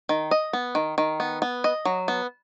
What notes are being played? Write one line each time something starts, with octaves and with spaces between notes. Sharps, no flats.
D#3
D#5
B3
D#3
D#3
B3
B3
D#5
F#3
B3